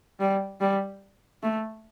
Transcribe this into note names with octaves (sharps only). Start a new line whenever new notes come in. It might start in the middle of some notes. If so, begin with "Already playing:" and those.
G3
G3
A3